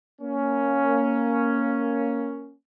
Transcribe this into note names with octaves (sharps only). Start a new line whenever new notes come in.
A#3 C#4